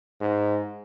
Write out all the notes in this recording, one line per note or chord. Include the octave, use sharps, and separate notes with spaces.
G#2